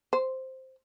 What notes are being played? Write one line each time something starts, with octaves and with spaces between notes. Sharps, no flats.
C5